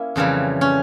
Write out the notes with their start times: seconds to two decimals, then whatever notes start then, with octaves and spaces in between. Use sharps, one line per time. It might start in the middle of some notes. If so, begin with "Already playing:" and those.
Already playing: A#3 C#4 E4
0.16 F2 C#3 E3 G3
0.61 C#4